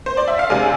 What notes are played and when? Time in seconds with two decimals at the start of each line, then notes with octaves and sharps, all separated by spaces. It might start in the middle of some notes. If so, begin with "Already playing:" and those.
0.06 C5
0.17 D5
0.28 E5
0.39 F5
0.50 C3 G#3 D4 G#5